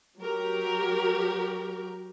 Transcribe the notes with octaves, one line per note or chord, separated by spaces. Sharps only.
F#3 G4 A#4